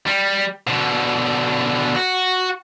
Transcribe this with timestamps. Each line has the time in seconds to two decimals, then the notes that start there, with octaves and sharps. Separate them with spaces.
0.06 G3
0.67 B2 D3
1.96 F#4